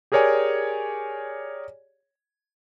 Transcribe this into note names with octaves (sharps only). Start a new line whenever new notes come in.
G4 G#4 A#4 C#5 D5 G#5